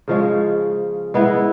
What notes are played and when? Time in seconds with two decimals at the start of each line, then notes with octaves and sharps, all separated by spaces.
0.08 C#3 F3 G#3 C#4
1.14 G#3 B3 E4